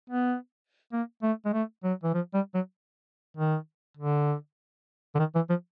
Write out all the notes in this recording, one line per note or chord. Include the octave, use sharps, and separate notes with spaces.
B3
A#3
A3
G#3
A3
F#3
E3
F3
G3
F#3
D#3
D3
D3
D#3
E3
F3